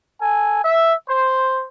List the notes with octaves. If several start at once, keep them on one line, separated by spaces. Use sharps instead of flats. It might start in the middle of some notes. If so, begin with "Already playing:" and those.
A4 G#5
E5
C5